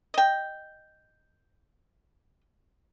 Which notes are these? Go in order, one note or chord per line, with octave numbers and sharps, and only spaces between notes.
D#5 G5